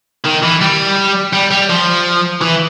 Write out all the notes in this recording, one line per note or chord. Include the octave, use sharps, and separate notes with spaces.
D#3
E3
G3
G3
G3
F3
E3